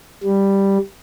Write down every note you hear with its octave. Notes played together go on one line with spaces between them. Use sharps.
G3